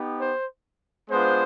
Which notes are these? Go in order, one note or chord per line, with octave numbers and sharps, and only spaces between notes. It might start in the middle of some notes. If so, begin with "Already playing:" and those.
Already playing: B3 D#4 G4
C5
G#3 B3 D4 F4 C5